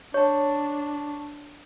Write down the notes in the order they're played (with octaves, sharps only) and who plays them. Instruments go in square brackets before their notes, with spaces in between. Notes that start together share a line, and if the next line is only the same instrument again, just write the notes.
[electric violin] D4 [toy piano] C#5 [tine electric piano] A5 C#6